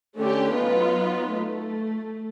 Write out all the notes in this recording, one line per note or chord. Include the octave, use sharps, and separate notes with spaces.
D3 A3 C#4 G4
F#3 B3 D#4 F4 B4
A3